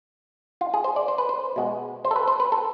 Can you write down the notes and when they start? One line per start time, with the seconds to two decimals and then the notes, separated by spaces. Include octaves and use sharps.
0.61 F4
0.74 G#4
0.84 C5
0.96 D5
1.08 C5
1.18 B4
1.29 C5
1.56 B2 G#3 B3
2.05 C5
2.11 A4
2.16 B4
2.28 C5
2.40 B4
2.52 A4